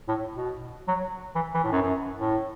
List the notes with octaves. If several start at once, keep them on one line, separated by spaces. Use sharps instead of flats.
A2
B2
F#3
E3
E3
A2
F#2
F#2
A2